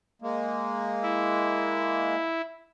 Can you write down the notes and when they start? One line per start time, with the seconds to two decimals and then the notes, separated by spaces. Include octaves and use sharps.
0.22 G#3 A#3
1.02 E4